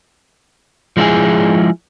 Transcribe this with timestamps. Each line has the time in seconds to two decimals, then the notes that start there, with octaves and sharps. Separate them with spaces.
0.97 F3 G#3 D4 E4 G#4